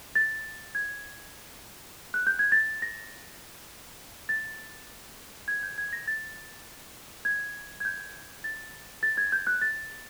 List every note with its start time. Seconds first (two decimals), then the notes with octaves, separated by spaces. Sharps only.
0.15 A6
0.75 G#6
2.14 F#6
2.27 G6
2.39 G#6
2.52 A6
2.82 A#6
4.29 A6
5.48 G#6
5.63 G6
5.78 G#6
5.93 A#6
6.08 A6
7.25 G#6
7.80 G#6
7.85 G6
8.44 A6
9.03 A6
9.17 G#6
9.32 G6
9.47 F#6
9.61 A6